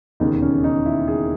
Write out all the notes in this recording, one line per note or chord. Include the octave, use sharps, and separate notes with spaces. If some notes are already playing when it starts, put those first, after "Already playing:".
E1 D#2 C#3 D#4
C#4
D#4
E4
G#4